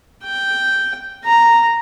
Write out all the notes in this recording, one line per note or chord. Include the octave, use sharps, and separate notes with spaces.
G5
A#5